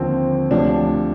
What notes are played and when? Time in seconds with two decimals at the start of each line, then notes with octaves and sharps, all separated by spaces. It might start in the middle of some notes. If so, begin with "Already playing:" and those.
Already playing: D#2 D3 F3 C4
0.51 D2 C3 F3 D4